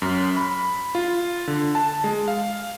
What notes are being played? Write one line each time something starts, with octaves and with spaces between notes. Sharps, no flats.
F#2
B5
F4
D3
A5
G#3
F5